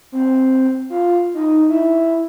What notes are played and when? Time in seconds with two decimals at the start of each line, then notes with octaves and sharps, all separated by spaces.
0.12 C4
0.90 F4
1.34 D#4
1.70 E4